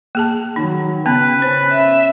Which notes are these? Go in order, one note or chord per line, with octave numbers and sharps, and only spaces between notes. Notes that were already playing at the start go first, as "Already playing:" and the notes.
A#3 G#4 A5
D#3 F#3 D#4
C#3 B3 C#4 B4
C#4 C5
E5